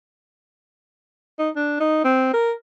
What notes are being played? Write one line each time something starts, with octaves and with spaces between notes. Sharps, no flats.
D#4
D4
D#4
C4
A#4